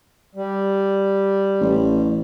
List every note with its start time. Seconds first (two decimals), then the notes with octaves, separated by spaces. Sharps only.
0.35 G3
1.61 A1